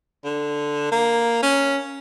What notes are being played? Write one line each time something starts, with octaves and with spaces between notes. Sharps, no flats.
D3
A#3
C#4